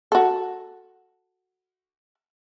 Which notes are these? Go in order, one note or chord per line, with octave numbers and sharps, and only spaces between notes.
F#4 A4